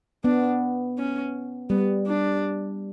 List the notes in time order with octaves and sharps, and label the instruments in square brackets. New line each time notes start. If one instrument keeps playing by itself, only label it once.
[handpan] B3 [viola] D4
[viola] C#4
[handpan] G3 [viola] B3
[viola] D4